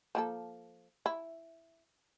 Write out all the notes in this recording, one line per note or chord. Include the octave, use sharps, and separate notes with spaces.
F3 A#3 A4
E4